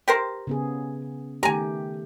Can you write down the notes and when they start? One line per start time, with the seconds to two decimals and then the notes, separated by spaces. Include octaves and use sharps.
0.08 G4 A#4 C5
0.47 C#3 B3 G#4
1.43 D#3 A3 G4 G#5 A#5